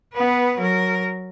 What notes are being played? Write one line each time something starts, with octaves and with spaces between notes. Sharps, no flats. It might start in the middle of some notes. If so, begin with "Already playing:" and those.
B3 B4
F#3 A#4